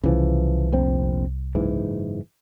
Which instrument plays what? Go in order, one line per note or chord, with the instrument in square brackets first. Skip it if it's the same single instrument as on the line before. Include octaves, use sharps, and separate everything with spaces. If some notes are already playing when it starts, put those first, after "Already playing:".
[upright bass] C2 [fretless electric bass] C#3 E3 F3
[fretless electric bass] F1 A#1 C4
F#1 G#2 E3